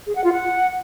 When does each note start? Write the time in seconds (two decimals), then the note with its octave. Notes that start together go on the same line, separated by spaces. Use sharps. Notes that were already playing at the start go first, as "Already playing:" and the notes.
0.07 G#4
0.15 F#5
0.24 F4
0.33 F#5